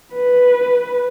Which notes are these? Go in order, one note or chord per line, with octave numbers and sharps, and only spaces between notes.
B4